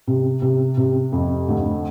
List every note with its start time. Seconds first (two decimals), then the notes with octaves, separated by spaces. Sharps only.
0.07 C3
0.42 C3
0.77 C3
1.12 F2
1.49 D2